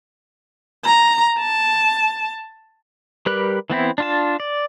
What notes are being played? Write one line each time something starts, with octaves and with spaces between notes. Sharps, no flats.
A#5
A5
G3 G4 A#4 B4 F#6
E3 B3 C4 E4
D4 F4 A5
D5